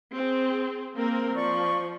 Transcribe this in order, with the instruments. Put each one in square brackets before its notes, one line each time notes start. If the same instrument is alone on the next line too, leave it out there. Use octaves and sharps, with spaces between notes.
[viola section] C4 G#4
A#3 C4 A#4
[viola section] F3 [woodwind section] D5 C#6